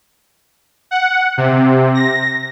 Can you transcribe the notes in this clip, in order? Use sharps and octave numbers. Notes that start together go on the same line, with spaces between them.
F#5
C3
A#6